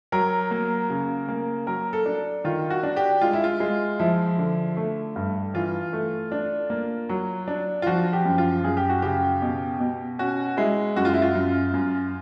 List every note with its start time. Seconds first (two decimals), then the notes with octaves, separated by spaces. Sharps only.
0.12 F#3 A#4
0.51 A#3
0.90 C#3
1.29 A#3
1.67 F#3 A#4
1.93 A4
2.06 D4
2.44 D#3 F4
2.70 F#4
2.83 D4
2.96 G4
3.21 G#3 F4
3.33 E4
3.44 F4
3.60 G#3
3.99 F3 E4
4.38 D3
4.77 A3
5.16 G2
5.54 E3 F4
5.93 A3
6.32 D4
6.70 A#3
7.09 F#3
7.48 D4
7.82 F4
7.86 F3 F#4
8.13 G4
8.25 F#2
8.38 F4
8.64 F#2 G#4
8.77 G4
8.89 F#4
9.02 C#3 G4
9.42 B2
9.80 B2
10.19 C#4 F#4
10.57 G#3 E4
10.96 F#2 F#4
11.05 F4
11.14 E4
11.22 F4
11.35 F#2
11.73 F#2